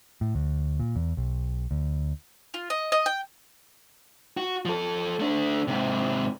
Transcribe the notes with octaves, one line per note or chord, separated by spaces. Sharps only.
A2
D2
A#2
E2
B1
D2
F4
D#5
D#5
G5
F#4
F3 A4
A3 D4
G#2 C3